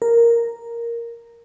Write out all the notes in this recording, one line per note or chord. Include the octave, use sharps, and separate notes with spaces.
A#4